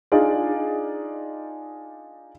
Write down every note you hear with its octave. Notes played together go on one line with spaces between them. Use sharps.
D4 D#4 F4 G#4 D5